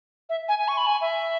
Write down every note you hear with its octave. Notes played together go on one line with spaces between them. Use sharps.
E5
G#5
G#5
C#6
B5
G#5
E5